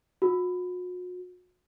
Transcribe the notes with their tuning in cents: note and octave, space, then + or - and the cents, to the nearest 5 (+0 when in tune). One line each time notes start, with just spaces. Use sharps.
F#4 -40